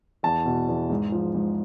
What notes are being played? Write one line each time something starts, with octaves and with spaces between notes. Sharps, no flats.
E2 A5
B2
E2
G#2
F3
G#2